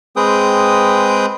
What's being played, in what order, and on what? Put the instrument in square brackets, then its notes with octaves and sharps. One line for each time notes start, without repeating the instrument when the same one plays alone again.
[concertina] G#3 C4 G#4 B4 G5 D#6